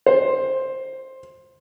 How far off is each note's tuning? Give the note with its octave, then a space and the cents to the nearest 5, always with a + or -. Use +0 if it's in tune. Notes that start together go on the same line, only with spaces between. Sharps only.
C5 +10